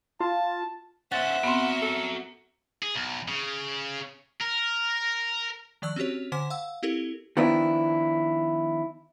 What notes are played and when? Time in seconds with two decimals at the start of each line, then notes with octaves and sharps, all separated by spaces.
0.20 F4 A5
1.12 C#4 C5 E5 F#5 A6
1.44 B3 C4 F#4 A#4
1.82 A4
2.83 G#4
2.95 B1
3.28 C#3
4.41 A#4
5.82 D#3 F3 D5 C#6 E6 F#6
5.96 C4 C#4 F#4 G4 C#5
6.32 D3 C5 G#5 D6 B6
6.50 F5 F#5 E6
6.83 C4 E4 G4 A4 A#4
7.37 D#3 F3 B3 D4 E4